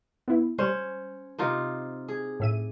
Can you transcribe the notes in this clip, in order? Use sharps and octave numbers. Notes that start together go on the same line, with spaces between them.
B3 E4
G3 C#4 C5
C3 D#4 F4
G#4
A2 E5 D#7